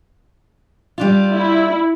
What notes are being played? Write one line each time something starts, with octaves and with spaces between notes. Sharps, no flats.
G3 D4 F4
E4